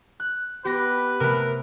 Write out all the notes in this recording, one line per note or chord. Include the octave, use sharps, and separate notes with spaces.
F#6
B3 G4 B4 A#6
C3 A3 A#4